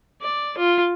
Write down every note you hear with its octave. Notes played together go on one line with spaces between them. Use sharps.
D5
F4